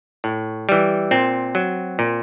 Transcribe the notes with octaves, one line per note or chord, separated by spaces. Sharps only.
A2
E3 G3
A#2 C4
F#3
A#2